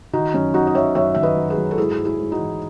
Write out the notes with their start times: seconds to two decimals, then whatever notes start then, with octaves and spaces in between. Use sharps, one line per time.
0.13 D#3 D#4 F#4
0.34 F#2 C#4
0.54 F#3 D#4 F#4
0.67 D#5
0.75 F#3 C#5 E5
0.95 F#2 C#5 E5
1.15 D#3 E5
1.23 B4 D#5
1.36 F#3
1.50 G#4 B4
1.57 F#3
1.71 A4
1.78 G#2 E4 G#4
1.98 G#2
2.05 E4 G#4
2.18 G#2
2.32 D#4 F#4
2.39 E3